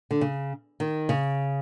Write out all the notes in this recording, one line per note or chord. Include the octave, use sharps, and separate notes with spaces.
D3
C#3
D#3
C#3